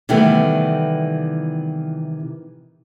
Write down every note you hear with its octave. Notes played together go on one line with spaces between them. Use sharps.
C3 D#3 E3 G3 A3 B3